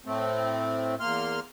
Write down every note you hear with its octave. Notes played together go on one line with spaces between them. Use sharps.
A2 A3 C4
E2 A#3 C6 F6